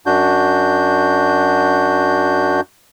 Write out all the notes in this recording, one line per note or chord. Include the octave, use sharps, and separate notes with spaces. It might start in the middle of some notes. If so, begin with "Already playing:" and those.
F#2 D4 F#4 G6